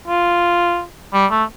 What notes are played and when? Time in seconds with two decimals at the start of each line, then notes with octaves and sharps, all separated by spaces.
0.08 F4
1.13 G3
1.31 A3